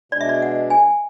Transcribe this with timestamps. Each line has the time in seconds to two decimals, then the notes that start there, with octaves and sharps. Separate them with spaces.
0.12 B2 G#3 D4 D5
0.21 E5
0.29 D5
0.42 F#5
0.70 G#5